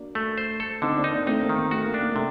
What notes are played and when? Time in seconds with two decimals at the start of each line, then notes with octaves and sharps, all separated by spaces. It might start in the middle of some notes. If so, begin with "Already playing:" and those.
Already playing: A#3 D4 F#4
0.15 A3
0.38 C5
0.60 A4
0.82 D3 C4 D#4
0.97 A#3 D4
1.04 D#4
1.12 A#3 D4
1.27 A3 C4 D#4
1.41 A#3
1.49 D#3
1.56 A#3
1.71 A3 F#4
1.86 A#3
1.94 D4
2.01 A#3
2.11 C3 A3